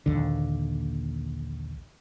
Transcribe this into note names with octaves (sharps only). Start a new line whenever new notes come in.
A#1 D#2 D3